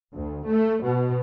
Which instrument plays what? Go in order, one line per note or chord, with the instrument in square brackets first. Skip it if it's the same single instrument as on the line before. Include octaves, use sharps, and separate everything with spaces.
[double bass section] D2
A3
B2